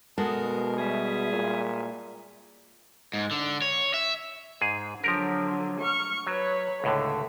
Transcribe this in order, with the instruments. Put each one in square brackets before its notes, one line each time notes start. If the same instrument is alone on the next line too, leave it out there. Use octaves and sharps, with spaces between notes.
[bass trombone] B2 [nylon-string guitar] G#3 F#4 A4 [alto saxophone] A#4 [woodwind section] A5 D#6
[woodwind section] G3 E5 [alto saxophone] G#4
[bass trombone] A#2
[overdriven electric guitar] G#2
D3
C#5
E5
[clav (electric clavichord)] G#2 G#4
[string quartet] D3 F#3 [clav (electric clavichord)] F3 G4 A#4
[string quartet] C#6 F6
[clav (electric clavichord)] F#3 [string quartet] B4 C#5
[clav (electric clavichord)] C#2 A2 D3 [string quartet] A3